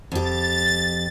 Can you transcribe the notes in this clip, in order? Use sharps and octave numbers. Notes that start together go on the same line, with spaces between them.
F2 G4 A6